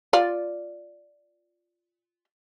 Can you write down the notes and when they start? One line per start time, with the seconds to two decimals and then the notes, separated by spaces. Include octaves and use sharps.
0.13 F4 D5